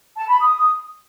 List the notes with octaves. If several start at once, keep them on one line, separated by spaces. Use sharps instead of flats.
A5
B5
D#6